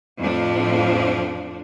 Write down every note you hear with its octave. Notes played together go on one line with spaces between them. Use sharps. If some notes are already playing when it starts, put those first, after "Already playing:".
F2 A2 F3 D4